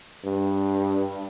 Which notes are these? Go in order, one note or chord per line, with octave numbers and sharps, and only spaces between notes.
G2